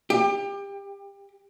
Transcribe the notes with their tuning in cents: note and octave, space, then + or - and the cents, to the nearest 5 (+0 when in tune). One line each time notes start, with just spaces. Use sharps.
G4 +25